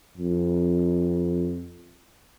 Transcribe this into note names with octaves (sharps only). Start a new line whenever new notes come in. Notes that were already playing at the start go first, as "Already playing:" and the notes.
F2